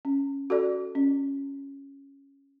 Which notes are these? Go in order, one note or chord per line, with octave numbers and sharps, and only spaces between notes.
C#4
F#4 A4 D5
C#4